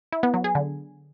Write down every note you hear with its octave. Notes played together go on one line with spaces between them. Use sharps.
E4
B3
F#3
G#4
D3